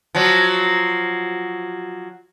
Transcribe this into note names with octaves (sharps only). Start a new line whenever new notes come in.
F3 F#3